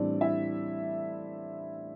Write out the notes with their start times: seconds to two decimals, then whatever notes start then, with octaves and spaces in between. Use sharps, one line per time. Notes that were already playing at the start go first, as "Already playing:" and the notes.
Already playing: A2 E3 G3 C4 D4 D5
0.21 E4 E5